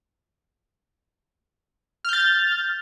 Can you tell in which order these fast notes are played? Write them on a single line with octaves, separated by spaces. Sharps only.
F6 G6 A6